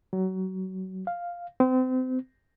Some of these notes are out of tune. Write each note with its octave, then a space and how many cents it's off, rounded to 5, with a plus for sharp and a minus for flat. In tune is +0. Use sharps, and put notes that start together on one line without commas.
F#3 +25
F5 +0
C4 -30